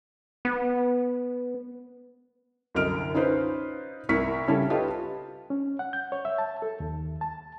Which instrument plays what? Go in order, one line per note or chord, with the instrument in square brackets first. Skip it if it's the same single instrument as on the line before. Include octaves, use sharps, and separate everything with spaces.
[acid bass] B3
[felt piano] C2 F#2 D3 D#5 F6 D7
C#4 D#4 F4 B4 C5
C2 E4 A#4 C#6 B6
C#3 G3 C#4 E4 A4
F4 G4 A4 B4 D#5
[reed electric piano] C#4
F#5
G6
C#5
E5
A5
A4
D#2
A5